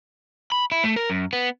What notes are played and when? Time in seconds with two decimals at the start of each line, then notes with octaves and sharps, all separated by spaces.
0.52 B5
0.72 E4
0.84 A3
0.96 A#4
1.10 F#2
1.33 B3